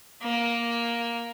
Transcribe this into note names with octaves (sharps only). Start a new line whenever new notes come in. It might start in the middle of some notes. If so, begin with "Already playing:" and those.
A#3